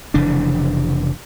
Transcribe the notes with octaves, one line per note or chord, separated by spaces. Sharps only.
F1 C#3 E3 D4